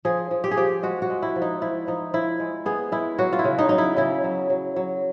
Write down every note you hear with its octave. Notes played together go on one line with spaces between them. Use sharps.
F3 G#4
F3
G4
G#4
F3 G4
G#3 F#4
F#4
G#3
E4
F3
D#4
F3 E4
F3 D#4
F3 E4
G#3
B3 G#4
G#3 E4
F#3 F#4
F4
E4
C#3
D#4
F#3 D#4
E4
C#3 E4
F#3
F#3
F#3